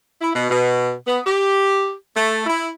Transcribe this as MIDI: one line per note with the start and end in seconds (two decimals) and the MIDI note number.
0.22 0.29 64
0.34 0.47 47
0.51 0.92 47
1.07 1.20 59
1.25 1.92 67
2.16 2.41 57
2.46 2.68 64